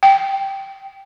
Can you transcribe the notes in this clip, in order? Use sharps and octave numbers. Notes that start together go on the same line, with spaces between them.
G5